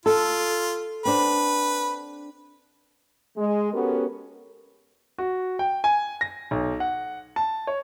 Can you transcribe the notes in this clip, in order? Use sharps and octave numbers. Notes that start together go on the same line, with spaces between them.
F4 A4
C4 D4 B4
G#3
B3 C#4 F#4 G4 A4 A#4
F#4
G5
G#5
A#6
B1
F#5
A5
C#5